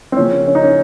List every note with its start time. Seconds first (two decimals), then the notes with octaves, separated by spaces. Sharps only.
0.12 C4
0.16 C#3 F3 A#3 C#4
0.47 C#4
0.55 D#4
0.63 C#4